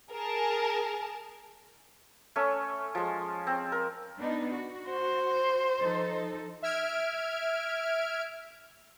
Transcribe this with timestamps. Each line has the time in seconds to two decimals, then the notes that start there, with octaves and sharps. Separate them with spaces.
0.12 G#4 A#4 A5
2.36 A3 C#4
2.95 F3 G#3
3.47 C4
3.72 A#4
4.20 B3 D4 D#4
4.54 F#4
4.89 C5
5.83 F3 D#4 A4
6.62 E5 F6 G#6 D7